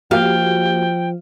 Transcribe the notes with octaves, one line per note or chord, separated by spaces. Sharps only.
F3 A#3 F#4 G4 F5 G5